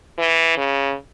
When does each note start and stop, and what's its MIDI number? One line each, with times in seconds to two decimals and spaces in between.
0.18 0.55 52
0.57 0.94 49